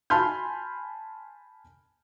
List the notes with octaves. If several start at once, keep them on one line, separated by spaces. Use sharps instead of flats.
G#5 A5 B5 C6 F6 G6